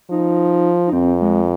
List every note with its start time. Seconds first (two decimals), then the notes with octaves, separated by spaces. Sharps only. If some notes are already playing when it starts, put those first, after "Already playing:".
0.10 F3 D#4
0.87 D#4
0.93 F2 C4
1.21 G#3